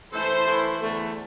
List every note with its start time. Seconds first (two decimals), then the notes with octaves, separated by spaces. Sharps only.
0.12 E3 A3 E4 A4 C5
0.47 E3 A3 E4 A4
0.82 E2 D3 A3